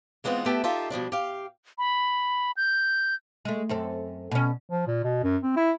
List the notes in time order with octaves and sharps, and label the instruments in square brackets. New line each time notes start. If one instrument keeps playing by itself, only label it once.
[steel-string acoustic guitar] E3 G#3 B3 C4 D#4 F4
A3 B3 G4 A4 E5 G5
D#4 F4 G4 A4 E5
B2 F3 G3 D4
G4 F5
[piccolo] B5
G6
[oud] G#3 A3
F#2 C4 A4
B2 C#4
[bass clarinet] F3
A#2
B2
F#2
C4
E4